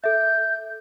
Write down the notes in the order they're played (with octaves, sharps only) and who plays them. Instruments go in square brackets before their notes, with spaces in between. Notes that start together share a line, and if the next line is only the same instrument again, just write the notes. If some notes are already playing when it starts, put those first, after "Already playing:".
[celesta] A4 E5 [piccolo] G6